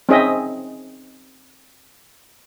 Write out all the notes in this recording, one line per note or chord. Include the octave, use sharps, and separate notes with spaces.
C4 C#4 D#4 G#4 D#5 E5